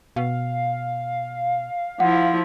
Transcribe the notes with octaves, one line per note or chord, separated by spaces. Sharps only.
B2 F5
F3 E4 F#5